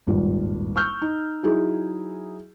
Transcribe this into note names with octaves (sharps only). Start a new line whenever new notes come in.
D#1 G#1 G2 F4
C#6 E6 F6 G6
D#4
F#3 D#4 E4 G#4